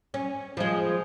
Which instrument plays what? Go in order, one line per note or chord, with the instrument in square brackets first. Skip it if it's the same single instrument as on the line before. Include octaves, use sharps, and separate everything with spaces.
[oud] C#4
F3 G#3